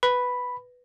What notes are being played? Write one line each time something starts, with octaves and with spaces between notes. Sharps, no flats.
B4 B5